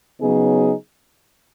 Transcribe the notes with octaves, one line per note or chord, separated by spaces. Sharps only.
C#3 F#3 B3 D#4 G#4